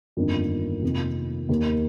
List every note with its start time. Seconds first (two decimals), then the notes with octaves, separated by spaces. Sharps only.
0.17 G1 F2 D#3 A#3 D4
0.83 F2 C3 D#3 A#3
1.49 D#2 D#3 A#3